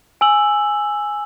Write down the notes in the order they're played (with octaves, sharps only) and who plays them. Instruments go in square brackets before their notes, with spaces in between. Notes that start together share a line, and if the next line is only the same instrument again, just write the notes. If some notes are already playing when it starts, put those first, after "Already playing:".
[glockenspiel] G#5 E6 F#7